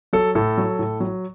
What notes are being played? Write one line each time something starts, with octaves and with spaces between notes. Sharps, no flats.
F#3 A4
A2 A4
F#3
A2
F#3